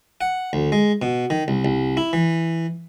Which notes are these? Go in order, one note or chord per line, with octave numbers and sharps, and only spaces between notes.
F#5
D2
G#3
B2
D#3
C2
C2
E4
E3